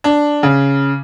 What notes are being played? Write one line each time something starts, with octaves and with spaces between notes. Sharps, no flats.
D4
C#3